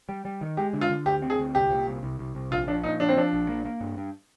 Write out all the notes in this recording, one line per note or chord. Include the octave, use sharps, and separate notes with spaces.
G3
G3
D#3
G#3 G4
D3
F4
D3
D2 G4
C4
G#4
D2
C2 G4
A#2
C2
C2
C2
C2
A#1 F4
F3 D4
A#2 D#4
F3 D4
C4
F3 D4
A#1
A#3
A#3
G2
G2